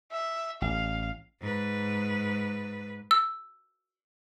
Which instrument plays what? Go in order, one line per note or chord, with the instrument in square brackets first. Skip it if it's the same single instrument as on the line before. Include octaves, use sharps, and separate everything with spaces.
[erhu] E5
[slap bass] A1 [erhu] F5
[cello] G#2 B4
[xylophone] E6